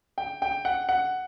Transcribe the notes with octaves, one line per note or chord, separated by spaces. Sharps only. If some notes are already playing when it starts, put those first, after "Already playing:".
G5
G5
F#5
F#5